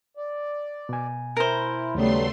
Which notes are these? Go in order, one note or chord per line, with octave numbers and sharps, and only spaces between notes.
D5
B2 G#5
E4 A#4 C5
D#2 C#3 F#3 G3 A3 B3 C6